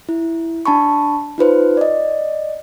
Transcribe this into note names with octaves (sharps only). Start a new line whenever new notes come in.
E4
D4 A5 B5 C#6
D#4 F4 B4 C5
D5 D#5